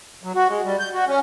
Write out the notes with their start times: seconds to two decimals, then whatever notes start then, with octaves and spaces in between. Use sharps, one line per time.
0.24 F#3
0.35 F#4
0.49 G#3
0.64 G3
0.79 G6
0.94 F#4
1.07 C#4